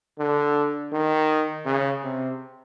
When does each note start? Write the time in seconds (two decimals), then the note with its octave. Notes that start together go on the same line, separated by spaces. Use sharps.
0.19 D3
0.93 D#3
1.66 C#3
2.04 C3